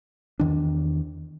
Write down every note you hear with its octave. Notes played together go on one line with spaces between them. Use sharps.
E2 D#3 D4